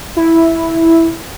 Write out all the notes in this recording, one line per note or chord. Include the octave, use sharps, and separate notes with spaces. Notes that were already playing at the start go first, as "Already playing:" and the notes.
E4